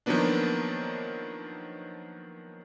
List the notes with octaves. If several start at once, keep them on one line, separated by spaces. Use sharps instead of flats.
D#3 F3 F#3 A#3 B3 D4